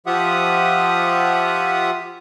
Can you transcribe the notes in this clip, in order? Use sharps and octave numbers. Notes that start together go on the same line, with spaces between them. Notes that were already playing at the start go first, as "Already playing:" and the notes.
F3 F4 G4 E5 F#5 D#6